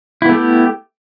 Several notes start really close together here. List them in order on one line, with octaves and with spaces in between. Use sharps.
E4 B3 A3 G4